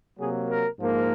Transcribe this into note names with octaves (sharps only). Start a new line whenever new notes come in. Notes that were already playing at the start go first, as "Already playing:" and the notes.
C3 F#3 A#3 G#4
A#4
G#2 F3 A#3